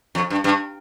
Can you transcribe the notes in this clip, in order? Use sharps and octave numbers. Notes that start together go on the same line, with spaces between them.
F2
G2
G2